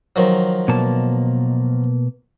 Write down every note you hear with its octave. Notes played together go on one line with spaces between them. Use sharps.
D#3 F3 F#3
B2 A#3 A5